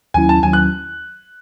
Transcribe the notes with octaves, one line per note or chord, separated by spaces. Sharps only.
D#2 D#3 F#3 C#4 E4 G#5
A5
D#2 D#3 F#3 C#4 E4 G#5
F#6